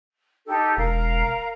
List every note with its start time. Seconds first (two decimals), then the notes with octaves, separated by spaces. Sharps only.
0.46 D#4 G4 A4
0.77 E1 A#4 F5 A#5